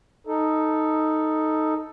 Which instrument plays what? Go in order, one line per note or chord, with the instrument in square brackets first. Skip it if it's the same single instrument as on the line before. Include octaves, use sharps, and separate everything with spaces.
[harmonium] D#4 A4